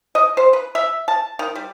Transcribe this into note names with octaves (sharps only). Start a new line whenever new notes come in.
D#5
C5
B4
E5
A5
D#3
G3